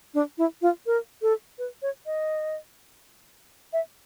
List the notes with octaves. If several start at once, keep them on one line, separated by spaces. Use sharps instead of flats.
D4
E4
F4
A#4
A4
B4
C#5
D#5
E5